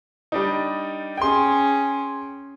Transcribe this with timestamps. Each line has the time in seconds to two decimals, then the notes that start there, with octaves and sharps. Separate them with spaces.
0.32 G3 D4 D#4
1.17 C#4 G#4 G5 C6